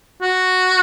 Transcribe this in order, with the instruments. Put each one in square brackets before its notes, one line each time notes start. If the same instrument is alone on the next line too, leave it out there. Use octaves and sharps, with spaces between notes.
[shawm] F#4